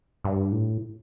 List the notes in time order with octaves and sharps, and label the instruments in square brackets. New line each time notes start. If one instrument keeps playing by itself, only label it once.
[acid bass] G2
A2